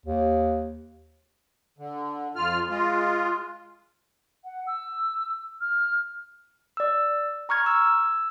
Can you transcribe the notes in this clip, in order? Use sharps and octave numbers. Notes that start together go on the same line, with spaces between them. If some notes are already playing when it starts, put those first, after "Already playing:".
D#2
D3
F2 F4 F6
G#3 F4
F#5
E6
F6
D5 E6
A#5 C#6 F6 G#6
E6